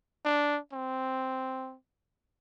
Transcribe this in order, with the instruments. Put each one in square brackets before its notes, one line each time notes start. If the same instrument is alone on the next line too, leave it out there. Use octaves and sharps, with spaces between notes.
[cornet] D4
C4